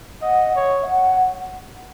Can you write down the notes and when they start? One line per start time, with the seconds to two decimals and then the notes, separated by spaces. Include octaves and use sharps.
0.21 D#5 F#5
0.55 C#5
0.83 E5
0.88 F#5